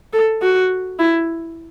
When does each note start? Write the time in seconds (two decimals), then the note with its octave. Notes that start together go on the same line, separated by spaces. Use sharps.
0.13 A4
0.42 F#4
0.99 E4